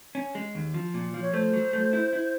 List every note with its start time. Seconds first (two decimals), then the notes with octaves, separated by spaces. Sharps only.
0.15 C#4
0.35 G#3
0.55 D#2
0.74 F3
0.94 A#2
1.14 F3
1.22 C#5
1.34 A3 C5
1.53 F#3
1.73 A3
1.93 E4
2.13 E4